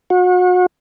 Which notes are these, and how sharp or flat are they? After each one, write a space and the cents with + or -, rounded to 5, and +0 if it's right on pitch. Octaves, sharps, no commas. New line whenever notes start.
F#4 -35